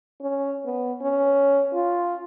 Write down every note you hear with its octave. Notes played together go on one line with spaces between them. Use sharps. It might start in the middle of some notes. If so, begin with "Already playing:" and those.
C#4
B3
C#4
F4